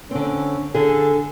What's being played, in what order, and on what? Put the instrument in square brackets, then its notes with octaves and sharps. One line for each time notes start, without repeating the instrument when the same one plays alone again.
[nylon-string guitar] D3 C4 [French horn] C#4
[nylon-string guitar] D3 G#4 [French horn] A4